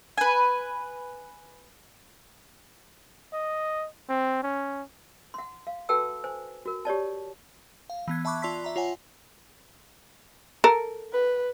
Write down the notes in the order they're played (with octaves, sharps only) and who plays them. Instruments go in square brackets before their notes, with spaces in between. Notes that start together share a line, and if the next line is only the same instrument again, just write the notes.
[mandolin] B4 G#5
[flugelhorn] D#5
C4
C#4
[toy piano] F#5 C6
F5
F#4 A4 B4 G5 A5 E6
C5 G#5
F#4 A#4
G4 C#5 D5 A5
[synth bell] F5
E3 B3 G#6
E5 A5 B5 C#6 D6 F#6
F4 D5 A5 C6 E6 B6
E5 A#5
F4 C#5 F#5 G#5
[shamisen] A4 A#4
[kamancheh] B4